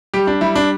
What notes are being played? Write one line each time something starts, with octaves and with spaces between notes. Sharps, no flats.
G3 G4
D4
G3 E4
D4